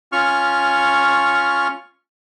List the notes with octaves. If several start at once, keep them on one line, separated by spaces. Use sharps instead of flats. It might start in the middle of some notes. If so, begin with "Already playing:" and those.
C#4 F4 C#6 F6